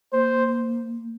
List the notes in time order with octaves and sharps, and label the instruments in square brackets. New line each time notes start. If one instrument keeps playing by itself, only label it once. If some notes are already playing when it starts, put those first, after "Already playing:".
[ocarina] A#3 [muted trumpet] C5